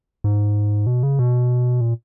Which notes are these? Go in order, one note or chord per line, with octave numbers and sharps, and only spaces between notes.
G#2
B2
C#3
B2
A#2